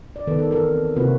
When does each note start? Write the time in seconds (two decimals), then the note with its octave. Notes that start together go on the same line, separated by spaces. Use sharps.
0.16 D5
0.27 D#3 B3 A4 B4
0.39 A4
0.51 E3 A4 A#4
0.67 C4
0.96 C3 A#3 C4 E4 F#4 B4